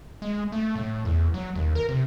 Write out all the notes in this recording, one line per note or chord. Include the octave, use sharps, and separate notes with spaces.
G#3
A3
A2
E2
F#3
D#2
A#4
C3